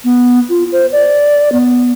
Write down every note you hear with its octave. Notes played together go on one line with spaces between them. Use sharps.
B3
F4
C5
D5
B3